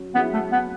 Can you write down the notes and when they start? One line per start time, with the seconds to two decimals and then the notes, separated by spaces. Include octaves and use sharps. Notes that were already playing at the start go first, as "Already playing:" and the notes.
Already playing: F#3 C#4
0.15 F#3 B3 C#4 E4 G#4
0.34 A3
0.52 B3